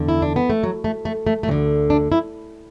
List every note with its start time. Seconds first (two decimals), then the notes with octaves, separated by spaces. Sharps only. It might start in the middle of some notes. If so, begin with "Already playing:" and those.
Already playing: E2 D3
0.08 E4
0.22 D4
0.36 B3
0.50 A3
0.63 F#3
0.84 A3
1.05 A3
1.27 A3
1.43 A3
1.48 D2 F#3
1.51 D3
1.90 D4
2.12 E4